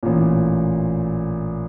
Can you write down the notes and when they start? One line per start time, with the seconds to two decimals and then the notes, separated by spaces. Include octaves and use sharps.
0.03 A1 A#2